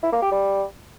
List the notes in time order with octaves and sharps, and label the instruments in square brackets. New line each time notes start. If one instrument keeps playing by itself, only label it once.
[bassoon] E4
A#3
G4
G3